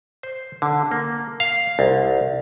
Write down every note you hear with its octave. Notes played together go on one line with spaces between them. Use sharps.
C5
D3
A#3
F5
C2